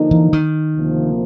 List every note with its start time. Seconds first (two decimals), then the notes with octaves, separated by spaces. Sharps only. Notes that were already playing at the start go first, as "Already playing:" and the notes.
Already playing: D3 F3 A#3 D#4
0.11 E3
0.33 D#3
0.76 D2 C3 F3 A#3